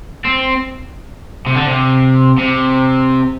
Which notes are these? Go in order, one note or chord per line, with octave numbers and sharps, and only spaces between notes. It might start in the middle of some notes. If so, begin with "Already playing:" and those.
C4
C3
D3
C3
C3